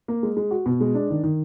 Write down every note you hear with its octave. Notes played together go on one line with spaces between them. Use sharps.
A#3
G#3
G#3
F#4
B2
G#3
D4
D#3
D#3